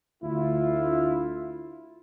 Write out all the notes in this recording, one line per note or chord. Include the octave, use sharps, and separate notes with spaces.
D2 E4 F4